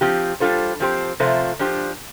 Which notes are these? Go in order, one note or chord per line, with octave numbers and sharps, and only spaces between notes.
F3 C4 G4
G3 D4 F4 A4 C5
F3 C4 G4 C5
C3 F3 A3 F4 C5
F3 D4 G4 C5